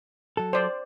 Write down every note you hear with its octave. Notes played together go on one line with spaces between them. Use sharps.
F#3 A4
C5 D5